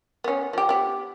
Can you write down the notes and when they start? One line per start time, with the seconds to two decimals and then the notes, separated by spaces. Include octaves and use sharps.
0.24 B3 C#4
0.53 F3 G4
0.69 B3 G4